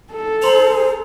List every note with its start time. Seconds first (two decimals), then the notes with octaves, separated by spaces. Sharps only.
0.13 A4
0.42 C5 A#5 C6 F7